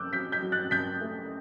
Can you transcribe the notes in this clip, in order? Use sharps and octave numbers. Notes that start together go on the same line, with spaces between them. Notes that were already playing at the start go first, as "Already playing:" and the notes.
Already playing: C#3 D6 E6 F#6 G6
F#3 G6 B6
G6 B6
F#3
F#6 A6
C#3 G6 B6
A3